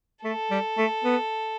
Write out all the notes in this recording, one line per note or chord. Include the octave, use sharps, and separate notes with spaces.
A3 A4
G3
A3
B3